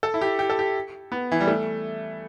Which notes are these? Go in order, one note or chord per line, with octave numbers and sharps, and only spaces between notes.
A4
E4
G4
G4
A4
G4
B3
E3
G3
A3